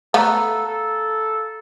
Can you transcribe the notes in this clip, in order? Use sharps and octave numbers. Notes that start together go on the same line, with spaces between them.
A3 B3 A4 F5 A#5
A4